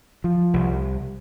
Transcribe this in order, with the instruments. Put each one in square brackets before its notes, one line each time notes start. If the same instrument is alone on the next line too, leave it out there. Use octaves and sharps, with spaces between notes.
[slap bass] F3
C2